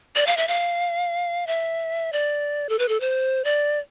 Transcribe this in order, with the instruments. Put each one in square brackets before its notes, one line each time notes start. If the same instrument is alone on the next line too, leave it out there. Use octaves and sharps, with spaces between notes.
[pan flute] D5
F5
E5
F5
E5
D5
A4
B4
A4
C5
D5